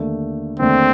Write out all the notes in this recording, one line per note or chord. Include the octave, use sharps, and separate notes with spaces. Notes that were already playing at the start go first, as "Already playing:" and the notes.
Already playing: D#2 D3 A3
D#2 D3 A3 C4